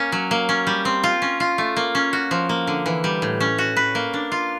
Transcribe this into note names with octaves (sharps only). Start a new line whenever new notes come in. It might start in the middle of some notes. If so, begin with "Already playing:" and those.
Already playing: A#3 C#4
F#3
A#3
C#4
G3
C4
F4
C#4
F4
A3
A#3
C#4
F#4
F3
A#3
D3
E3
G3
A2
C#4
F#4
B4
A#3
D4
F4